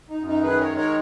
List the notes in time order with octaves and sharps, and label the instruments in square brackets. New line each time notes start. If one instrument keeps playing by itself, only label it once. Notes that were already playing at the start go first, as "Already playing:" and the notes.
[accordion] D#4
F#2
D#4
D#3 G#4 B4
A#4 C#5
G#3
A#4 C#5